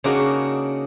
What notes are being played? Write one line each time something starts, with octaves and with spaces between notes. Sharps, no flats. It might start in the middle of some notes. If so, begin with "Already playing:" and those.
C#3 A#3 D4 D#4 F#4